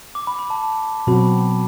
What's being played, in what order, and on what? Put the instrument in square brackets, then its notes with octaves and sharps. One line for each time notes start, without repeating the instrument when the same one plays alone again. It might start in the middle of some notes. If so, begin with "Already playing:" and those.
[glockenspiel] D6
B5
B5
A5
[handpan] B2 F#3 C4 F#4 [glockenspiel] B5